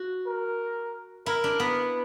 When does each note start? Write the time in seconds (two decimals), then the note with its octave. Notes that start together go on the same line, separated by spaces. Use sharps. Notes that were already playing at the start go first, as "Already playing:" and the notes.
Already playing: F#4
0.27 A#4
1.26 E4 A#4
1.44 D4
1.60 B3